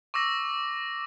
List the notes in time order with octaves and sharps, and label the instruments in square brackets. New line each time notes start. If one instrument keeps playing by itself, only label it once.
[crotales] C#6 D6 E6 A#6